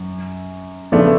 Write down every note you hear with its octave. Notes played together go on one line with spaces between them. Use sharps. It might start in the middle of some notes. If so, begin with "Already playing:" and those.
Already playing: F#2
C#3 F3 A3 B3 D4